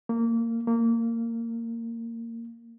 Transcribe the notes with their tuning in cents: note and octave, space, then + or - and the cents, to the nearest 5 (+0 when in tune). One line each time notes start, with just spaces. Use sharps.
A#3 -20
A#3 -20